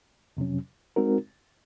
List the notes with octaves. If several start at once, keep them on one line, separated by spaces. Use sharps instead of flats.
F2 C3 F#3 C#4
G#3 C4 D#4 F#4 A#4